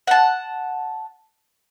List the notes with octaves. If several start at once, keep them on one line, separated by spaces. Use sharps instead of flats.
F#5 A5